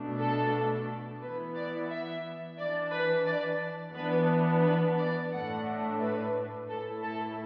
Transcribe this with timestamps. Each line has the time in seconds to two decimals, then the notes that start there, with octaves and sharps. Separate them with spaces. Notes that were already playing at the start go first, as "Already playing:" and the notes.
Already playing: B2 A3 D4
0.18 A4
1.21 E3 B3 E4 B4
1.55 D5
1.89 E5
2.58 E3 D4 D5
2.92 B4
3.26 D5
3.95 E3 B3 D4 B4
4.63 B4
4.98 D5
5.32 A2 A3 D4 F#5
6.01 B4
6.68 A2 A3 E4 A4
7.03 A4